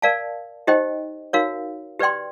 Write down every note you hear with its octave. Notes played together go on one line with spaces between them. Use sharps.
A#4 D5 F5 A5
D#4 G4 C5 D#5 G5
D#4 F#4 A#4 C#5 F5
G4 B4 D5 G5 C6